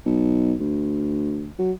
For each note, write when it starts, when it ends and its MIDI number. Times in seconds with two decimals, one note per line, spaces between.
0.05 0.55 35
0.60 1.51 38
1.59 1.72 54